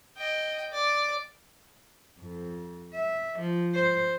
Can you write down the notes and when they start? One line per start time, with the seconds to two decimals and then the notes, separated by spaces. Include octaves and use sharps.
0.17 D#5 G5
0.72 D5
2.19 F2
2.94 E5
3.39 F3
3.75 C5